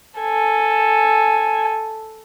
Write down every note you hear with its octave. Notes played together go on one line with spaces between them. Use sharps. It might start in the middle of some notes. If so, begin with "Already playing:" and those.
A4 G#5